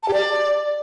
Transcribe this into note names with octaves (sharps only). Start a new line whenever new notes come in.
A5
G4
D5